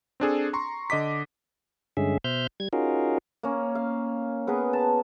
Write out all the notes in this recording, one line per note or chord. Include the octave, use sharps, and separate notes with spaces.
C4 D4 G#4 A4
A#5 C6 C#6
D3 D#5 D6 B6
G2 D3 G#3 C#4 G#4 E5
B2 C5 E5 F6 G6
G3 G#6
C#4 D#4 F4 F#4 G#4 A#4
A#3 C#4
F5
B3 G#4 A#4 B4
A5